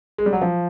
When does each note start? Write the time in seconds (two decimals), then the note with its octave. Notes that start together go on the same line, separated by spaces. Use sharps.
0.18 G#3
0.26 G3
0.33 F#3
0.42 F3